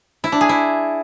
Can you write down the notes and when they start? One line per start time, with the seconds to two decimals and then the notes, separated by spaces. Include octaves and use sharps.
0.24 E4
0.32 D4
0.41 G#4
0.49 E4